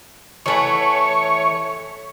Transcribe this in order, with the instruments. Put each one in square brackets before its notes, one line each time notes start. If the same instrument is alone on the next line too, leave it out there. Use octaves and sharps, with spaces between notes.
[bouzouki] E3 A3 F#5 [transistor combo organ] C#5